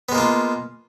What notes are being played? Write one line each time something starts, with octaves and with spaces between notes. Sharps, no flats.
G#3 A#3 B3 F4